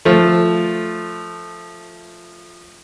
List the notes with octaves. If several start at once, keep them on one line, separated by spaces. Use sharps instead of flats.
F3 A3